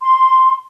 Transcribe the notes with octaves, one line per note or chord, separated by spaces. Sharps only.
C6